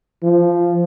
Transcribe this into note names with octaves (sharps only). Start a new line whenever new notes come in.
F3